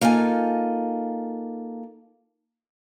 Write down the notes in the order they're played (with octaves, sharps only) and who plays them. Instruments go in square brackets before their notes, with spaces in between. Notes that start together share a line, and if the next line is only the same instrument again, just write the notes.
[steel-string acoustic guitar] A#3 D#4 F4 A4 G#5